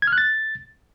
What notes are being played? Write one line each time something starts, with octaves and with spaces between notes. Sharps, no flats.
G#6
F6
F#6
A6